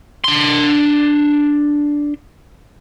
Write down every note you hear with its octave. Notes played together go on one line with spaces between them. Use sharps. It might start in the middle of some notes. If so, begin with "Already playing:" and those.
D4 C6